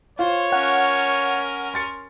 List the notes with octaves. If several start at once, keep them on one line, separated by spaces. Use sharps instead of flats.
F4 C5 C#5
C#4 A#4 F#5
C6 A6 C#7